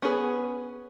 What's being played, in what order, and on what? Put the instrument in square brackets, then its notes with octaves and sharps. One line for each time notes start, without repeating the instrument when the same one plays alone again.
[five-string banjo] B3 C#4 D4 G#4 B4